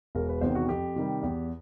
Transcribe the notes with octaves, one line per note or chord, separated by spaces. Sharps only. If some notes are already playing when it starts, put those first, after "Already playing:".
E1 A#4
B4
E2 C3 D#3 C5
F#4
F2 G4
C3 D#3 G3
E2